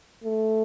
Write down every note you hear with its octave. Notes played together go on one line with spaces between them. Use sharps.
A3